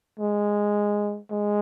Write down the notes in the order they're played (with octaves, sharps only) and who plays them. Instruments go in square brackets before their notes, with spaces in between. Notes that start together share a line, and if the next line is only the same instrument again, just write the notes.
[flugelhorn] G#3
G#3